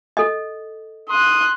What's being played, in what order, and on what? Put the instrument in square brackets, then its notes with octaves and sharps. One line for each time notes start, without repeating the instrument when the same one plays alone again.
[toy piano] A4 D#5
[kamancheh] C6 F#6 [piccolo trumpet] D#6